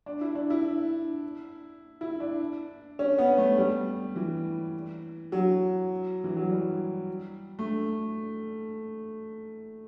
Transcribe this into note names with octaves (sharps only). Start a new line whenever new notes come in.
D4
E4
D4
E4
E4
D4
C#4
B3
A3
G3
E3
F#3
E3
F#3
G3
A3